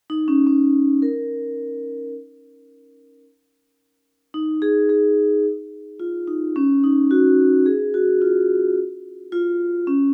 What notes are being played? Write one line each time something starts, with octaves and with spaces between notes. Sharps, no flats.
D#4
C#4
C#4
A#4
D#4
G#4
G#4
F4
D#4
C#4
D#4
F#4
G#4
F#4
F4
F4
C#4